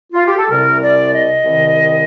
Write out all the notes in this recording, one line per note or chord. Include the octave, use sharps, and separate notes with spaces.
F4
G4
A4
C2 C3 G3 A#4
D5
D#5
C2 C3 D#3